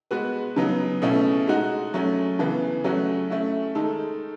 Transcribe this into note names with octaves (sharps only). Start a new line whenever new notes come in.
G#3 B3 F#4 B4
C#3 F#3 B3 D#4
B2 A3 C#4 E4
G#3 D#4 F#4
F#3 A3 C#4
C#3 E3 B3
F#3 A3 C#4 F#4
A3 C#4 E4
D#3 G#3 D#4 A4